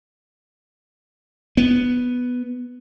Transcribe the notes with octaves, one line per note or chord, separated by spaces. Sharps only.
B3